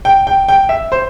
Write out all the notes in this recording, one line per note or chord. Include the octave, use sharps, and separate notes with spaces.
G5
G5
G5
E5
C5